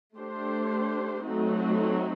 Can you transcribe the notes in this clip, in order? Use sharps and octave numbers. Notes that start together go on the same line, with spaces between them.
A3 D4 G4 C5
F#3 A3 C4 D#4 F#4